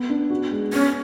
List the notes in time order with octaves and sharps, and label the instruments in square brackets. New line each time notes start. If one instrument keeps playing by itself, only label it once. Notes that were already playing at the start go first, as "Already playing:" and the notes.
Already playing: [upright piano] B3
D4
F#4
G#3
[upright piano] B3 [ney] C#4